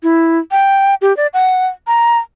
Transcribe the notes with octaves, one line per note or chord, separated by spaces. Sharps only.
E4
G5
G4
D5
F#5
A#5